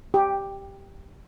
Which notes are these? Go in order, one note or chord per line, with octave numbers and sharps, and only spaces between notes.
G4